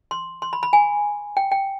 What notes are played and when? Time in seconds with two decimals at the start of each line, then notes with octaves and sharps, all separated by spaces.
0.11 C6
0.42 C6
0.53 B5
0.63 B5
0.73 G#5
1.37 G5
1.52 G5